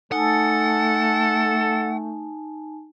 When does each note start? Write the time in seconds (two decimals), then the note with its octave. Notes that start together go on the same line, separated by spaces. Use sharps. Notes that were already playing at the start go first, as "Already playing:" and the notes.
0.12 A3 D#4 A4 F#5 G#5 A5